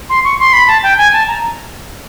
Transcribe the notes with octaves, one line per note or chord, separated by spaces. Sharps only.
C6
C#6
C6
B5
A5
G5
G#5
A5
A#5